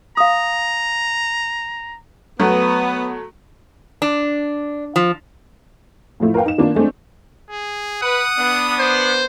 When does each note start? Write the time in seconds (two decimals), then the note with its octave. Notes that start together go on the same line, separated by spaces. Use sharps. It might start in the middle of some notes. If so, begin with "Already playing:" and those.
0.17 F5 A#5 D#6
2.40 F#3 A3 B3
4.02 D4
4.96 F3
6.20 A2 F3 A3 E4
6.34 A#4 B4 F5 G5
6.46 D#4 E7
6.58 D#3 A#3 B3 D4 F4
6.75 G#3 A3 C4 D4
7.50 G#4
8.03 B4 F#5 D#6
8.37 B3 D4
8.79 C5